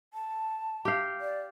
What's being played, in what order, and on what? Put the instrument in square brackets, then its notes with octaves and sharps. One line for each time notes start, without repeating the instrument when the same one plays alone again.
[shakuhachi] A5
[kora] G4 F5
[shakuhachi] D5